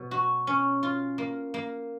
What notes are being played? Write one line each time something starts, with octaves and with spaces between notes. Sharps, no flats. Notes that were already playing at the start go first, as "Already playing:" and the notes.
Already playing: B2 F#3
F#4
C#4
F4
A#3
A#3